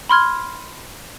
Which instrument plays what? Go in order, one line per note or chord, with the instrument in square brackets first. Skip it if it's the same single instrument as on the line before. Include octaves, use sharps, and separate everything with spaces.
[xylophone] B5 C6 F6 G#6